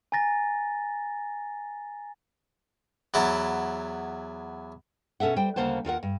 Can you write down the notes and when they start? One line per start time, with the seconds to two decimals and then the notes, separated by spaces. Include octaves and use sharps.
0.12 G#5 A#5 A6 A#6
3.14 E2 F#3 E4 A5
5.20 B2 C#4 A4 E5 F#5
5.36 G3 C5 G5
5.56 D2 C#3 A#3 C5 F#5 A5
5.85 D#2 F4 A#4 F#5
6.03 G2